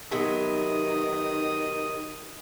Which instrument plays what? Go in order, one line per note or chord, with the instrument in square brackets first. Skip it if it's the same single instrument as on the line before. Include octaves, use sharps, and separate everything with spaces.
[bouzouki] C3 F#3 B3 [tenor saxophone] D#3 [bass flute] D#4 [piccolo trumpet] D#6